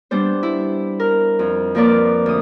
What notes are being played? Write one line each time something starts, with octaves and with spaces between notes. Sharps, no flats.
G3 B3 D4 C5
E4
A#4
F2
F3 A#3 A#4 B4 D5
D2 D#6